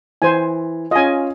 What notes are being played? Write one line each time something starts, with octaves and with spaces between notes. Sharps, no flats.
E3 C5 G#5
C#4 F4 D#5 G#5